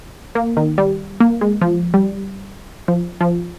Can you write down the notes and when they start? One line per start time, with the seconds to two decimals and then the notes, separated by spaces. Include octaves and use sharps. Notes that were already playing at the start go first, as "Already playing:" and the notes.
0.35 A#3
0.57 D#3
0.78 G3
1.20 A#3
1.41 G#3
1.62 F3
1.94 G3
2.88 F3
3.21 F3